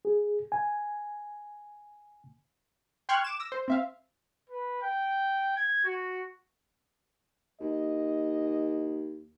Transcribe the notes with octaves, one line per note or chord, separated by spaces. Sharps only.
G#4
G#5
G5 C6 C#6 F6 F#6 G#6
D6 E7
E6 A#6
C5
C4 E5 F5
B4
G5
G#6
F#4
D#2 D#5